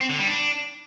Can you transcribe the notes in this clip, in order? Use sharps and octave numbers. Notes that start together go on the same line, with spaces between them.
C4
D3
G3
D4